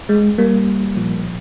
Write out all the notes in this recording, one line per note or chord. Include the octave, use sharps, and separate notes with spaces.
G#3
G3 A#3
A#2 F3